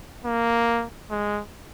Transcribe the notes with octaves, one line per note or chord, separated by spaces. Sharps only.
A#3
G#3